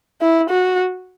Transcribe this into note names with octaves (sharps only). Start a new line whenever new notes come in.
E4
F#4